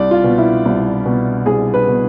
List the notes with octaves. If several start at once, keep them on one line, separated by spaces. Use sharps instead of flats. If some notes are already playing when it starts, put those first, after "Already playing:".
Already playing: C2 D5
F4
B2
E4
C2
B2
C2 G#4
B4
B2